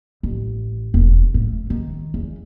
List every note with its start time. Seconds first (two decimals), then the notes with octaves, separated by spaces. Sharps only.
0.23 A1
0.94 E1
1.34 A2
1.70 D#3
2.14 E2